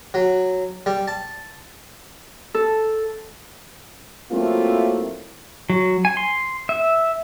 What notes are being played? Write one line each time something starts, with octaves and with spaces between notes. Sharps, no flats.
F#3
G3
A5
A4
F#3 A3 A#3 C4 E4 F4
F#3
G#5
C6
E5